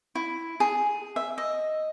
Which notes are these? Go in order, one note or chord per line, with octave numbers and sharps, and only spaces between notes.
E4
G#4
E5
D#5